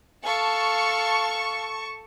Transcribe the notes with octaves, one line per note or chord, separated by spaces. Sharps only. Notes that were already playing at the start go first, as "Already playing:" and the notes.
A4 F5 A5 C#6